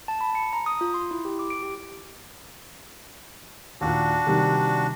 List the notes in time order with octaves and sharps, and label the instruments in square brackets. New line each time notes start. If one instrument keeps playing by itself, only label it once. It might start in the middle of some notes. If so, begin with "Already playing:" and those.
[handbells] A5
B5
C#7
A#5
D#6
F4
C6
E4
G4
D6
D7
G4
[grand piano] D#2 A#2 [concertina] D4 F#4
[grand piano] C3 D#3 G3